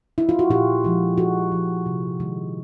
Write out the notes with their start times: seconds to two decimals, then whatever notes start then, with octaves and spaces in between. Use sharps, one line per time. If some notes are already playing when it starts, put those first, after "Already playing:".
0.18 E4
0.29 F4
0.39 F#4
0.50 A#2 F4 G4
0.84 F3 G#3
1.18 A#2 F#4 G#4
1.52 F3 G#3
1.86 C3
2.20 D#3 G#3